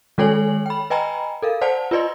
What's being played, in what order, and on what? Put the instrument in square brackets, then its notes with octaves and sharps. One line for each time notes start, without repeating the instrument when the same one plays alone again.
[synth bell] D#3 G#3 A4 C#5 G#5 F#7
G5 B5
B4 D#5 G5 G#5 A#5 B5
A4 A#4 F5
C5 D5 F#5 A5
F4 B4 D5 D#5 C6